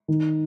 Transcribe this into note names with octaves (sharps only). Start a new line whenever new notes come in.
D#3